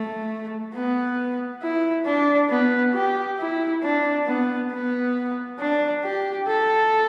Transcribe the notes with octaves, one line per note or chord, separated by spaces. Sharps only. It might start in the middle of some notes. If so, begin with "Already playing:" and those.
Already playing: A3
B3
E4
D4
B3
G4
E4
D4
B3
B3
D4
G4
A4